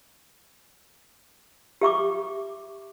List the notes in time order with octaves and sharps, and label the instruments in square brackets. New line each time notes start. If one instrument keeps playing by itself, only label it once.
[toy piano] G4 E5 C#6 D6